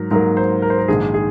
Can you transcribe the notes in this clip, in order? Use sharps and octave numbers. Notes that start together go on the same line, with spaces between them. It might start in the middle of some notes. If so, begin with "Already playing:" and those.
Already playing: G#2 F#3 A#4
G#2 F#3 A#3 A#4
C5
A#4
C5
A#4
A#1 G#2 D#3 G#4
G#4